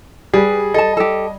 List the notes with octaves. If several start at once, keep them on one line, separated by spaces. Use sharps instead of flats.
G3 G#4 B4
A4 D#5 A5
G4 A4